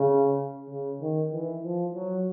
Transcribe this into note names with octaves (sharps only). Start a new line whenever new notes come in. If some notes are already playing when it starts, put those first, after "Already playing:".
Already playing: C#3
C#3
D#3
E3
F3
F#3